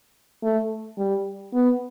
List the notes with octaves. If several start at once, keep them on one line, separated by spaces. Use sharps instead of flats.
A3
G3
B3